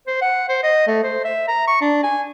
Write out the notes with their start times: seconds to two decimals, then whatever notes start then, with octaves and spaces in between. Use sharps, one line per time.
0.07 C5
0.21 F#5
0.49 C5
0.63 D#5
0.88 A3
1.03 C5
1.25 E5
1.48 A#5
1.67 C#6
1.81 D4
2.03 G#5